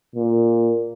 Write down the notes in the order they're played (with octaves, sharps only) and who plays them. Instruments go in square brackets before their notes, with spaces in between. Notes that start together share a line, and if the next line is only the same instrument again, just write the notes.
[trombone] A#2